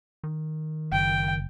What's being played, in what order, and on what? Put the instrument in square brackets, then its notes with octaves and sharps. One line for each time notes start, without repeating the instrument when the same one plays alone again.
[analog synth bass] D#3
[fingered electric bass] F#1 [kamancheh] G5